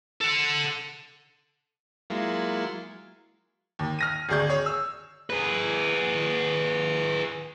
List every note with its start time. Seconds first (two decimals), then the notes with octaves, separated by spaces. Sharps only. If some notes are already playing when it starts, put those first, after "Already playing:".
0.21 A4 F#5
2.10 F#3 G#3 A#3 E4 F4
3.79 D#2
3.99 F6 A#6 D#7
4.29 G#1 D2 G#4 D5 C#6 G6
4.47 G#4 C#5
4.66 E6
5.30 G#4 B4